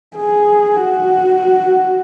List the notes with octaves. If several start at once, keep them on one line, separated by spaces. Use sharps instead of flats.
G#4
F#4